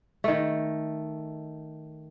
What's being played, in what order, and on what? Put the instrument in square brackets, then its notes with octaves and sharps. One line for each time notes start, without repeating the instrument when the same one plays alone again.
[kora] D#3 A3